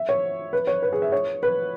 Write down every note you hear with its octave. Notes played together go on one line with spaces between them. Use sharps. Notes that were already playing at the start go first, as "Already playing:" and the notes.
Already playing: E5
C#5
B4
C#5
B4
G#4
E5
C#5
B4